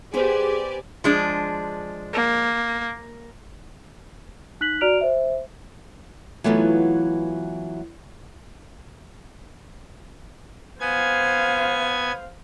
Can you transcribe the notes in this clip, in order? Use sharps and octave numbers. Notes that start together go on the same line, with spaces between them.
B3 G4 G#4 B4 C5 D5 G#5
F3 G#3 D4
A#3
D#4 F#6 B6 F#7
F#4 D5 A#5 F6 D7 F7
C5 E5
E3 F#3 A3 B3 D#4 F4
B3 C5 F5 G#5 G#6